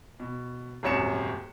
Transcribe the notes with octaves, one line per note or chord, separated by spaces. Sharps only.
B2
D#1 G#1 F#2 C#5 C#7 E7